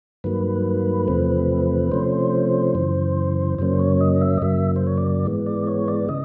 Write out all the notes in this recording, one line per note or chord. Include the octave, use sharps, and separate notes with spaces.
G2 D#3 F#3 A#3 B4
E2 C3 F3 A3 C4
C3 F3 A3 C#4 C5
F#2 C#3 E3
F#2 C#3 F#3 A#3 C#4 C5
C#5
D#5
E5
D#5
F#2 C#3 F#3 A#3 E5
C5
C#5
D5
G#2 E3 G#3 B3
D5
C#5
D5
C#3 D#5